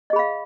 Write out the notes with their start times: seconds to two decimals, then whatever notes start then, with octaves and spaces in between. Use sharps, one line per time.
0.10 D#5
0.13 G#4
0.16 B5
0.19 F5